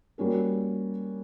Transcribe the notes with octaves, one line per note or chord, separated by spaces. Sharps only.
G3 A#3 C#4 F#4 A#4